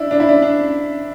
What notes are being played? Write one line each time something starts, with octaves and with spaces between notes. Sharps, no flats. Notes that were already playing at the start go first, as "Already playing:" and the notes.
Already playing: D4 E4
D4
E4
D4
D4